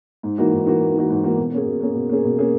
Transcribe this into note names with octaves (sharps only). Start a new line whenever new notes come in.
G#2
E3 A#3 D#4 F#4
G#2
E3 A#3 D#4 F#4
G#2
E3 A#3 D#4 F#4
G#2
E3 A#3 D#4 F#4
B2
A#3 C#4 G#4
B2
A#3 C#4 G#4
B2
A#3 C#4 G#4
B2
A#3 C#4 G#4